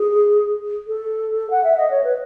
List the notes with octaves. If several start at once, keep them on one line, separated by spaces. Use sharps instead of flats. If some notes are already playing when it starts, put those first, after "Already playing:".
Already playing: G#4
A4
F#5
E5
D#5
C#5
B4